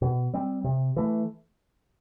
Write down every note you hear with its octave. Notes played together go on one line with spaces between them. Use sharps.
B2
G3 C4
C3
E3 A3